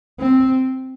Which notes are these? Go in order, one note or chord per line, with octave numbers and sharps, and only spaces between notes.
C4